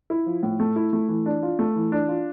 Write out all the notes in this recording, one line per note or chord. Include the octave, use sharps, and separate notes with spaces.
E4
F3
A2
A3
E4
A3
E3
D4
F4
A3
E3
D4
F4